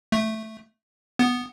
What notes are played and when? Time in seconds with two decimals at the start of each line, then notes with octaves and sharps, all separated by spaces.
0.12 A3
1.19 B3